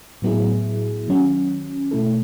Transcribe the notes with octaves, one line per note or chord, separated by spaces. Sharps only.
A2 F#3 B3 E4 G#4
D#3 F#3 C#4
B2 A3 E4 A4